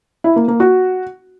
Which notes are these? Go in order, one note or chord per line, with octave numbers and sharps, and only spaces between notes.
E4
A#3
A#3
F#4